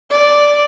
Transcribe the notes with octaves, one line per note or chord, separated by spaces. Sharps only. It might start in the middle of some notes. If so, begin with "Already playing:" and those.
D5